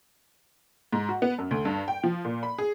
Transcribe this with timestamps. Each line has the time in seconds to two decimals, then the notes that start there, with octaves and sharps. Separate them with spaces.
0.93 G#2
1.09 F#4
1.22 B3
1.38 F#2
1.51 D2
1.65 G2
1.88 G5
2.04 F3
2.25 A#2
2.43 B5
2.58 G#4